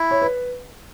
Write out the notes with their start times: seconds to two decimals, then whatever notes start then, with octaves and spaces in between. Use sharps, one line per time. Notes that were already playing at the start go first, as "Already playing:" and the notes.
Already playing: E4
0.11 C#5
0.22 B4